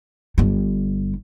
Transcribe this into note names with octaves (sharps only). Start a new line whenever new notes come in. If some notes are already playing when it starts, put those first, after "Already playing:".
G1 G3